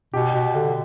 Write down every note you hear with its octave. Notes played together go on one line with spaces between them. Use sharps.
B2 G4
B2
D3